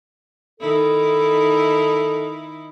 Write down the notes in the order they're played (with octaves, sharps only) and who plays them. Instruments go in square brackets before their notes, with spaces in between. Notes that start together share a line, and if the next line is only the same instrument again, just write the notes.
[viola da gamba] D#3 D#4 E4 [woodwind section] A4